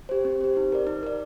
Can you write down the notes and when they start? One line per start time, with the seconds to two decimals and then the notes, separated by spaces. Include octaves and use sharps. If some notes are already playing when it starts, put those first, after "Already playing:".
0.09 G4 C5
0.25 C4
0.41 G4 C5
0.57 D#4
0.72 A#4 D5
0.87 D#4
1.03 A#4 D5